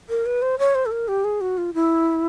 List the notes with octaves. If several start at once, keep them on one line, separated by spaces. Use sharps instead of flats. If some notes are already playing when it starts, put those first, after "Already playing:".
A#4
B4
C5
C#5
C5
A4
A#4
G4
G#4
F#4
F4
E4